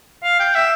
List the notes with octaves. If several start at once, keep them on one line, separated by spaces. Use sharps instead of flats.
F5
G5
E5